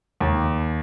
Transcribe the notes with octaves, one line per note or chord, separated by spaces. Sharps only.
D#2